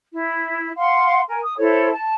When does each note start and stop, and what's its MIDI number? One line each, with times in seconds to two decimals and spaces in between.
0.12 0.70 64
0.77 1.21 77
0.77 1.21 78
0.77 1.21 84
1.28 1.40 70
1.28 1.40 80
1.43 1.55 87
1.58 1.90 64
1.58 1.90 69
1.58 1.90 72
1.58 1.90 73
1.90 2.14 81